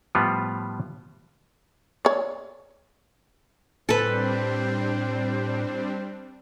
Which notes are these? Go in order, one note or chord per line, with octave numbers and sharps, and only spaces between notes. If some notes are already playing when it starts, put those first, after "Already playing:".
A2 F3 G3 B3 F4
C#5 D5
A2 G3 C4 D4 A4 B4 C5